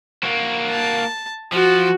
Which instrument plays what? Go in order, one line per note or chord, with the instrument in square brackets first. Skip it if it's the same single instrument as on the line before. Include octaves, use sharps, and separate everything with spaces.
[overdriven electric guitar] A#3 F#4
[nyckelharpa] A5
[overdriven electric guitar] F3 [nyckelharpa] F#4